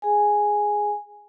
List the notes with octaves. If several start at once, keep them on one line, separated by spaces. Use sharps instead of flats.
G#4 G#5